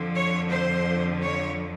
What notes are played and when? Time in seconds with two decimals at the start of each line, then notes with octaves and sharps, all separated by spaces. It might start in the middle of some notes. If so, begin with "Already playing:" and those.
Already playing: F2 D3 F3
0.17 C#5
0.52 C5
1.23 C#5